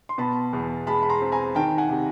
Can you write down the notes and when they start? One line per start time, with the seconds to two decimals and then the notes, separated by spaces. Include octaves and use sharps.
0.09 C6
0.18 B2 A5 B5
0.53 E2
0.87 G#3 A5 B5
1.03 B5
1.09 A#5 C6
1.22 C4
1.32 G#5 A#5
1.55 D#3 G5 A5
1.78 F#5 G#5
1.89 C3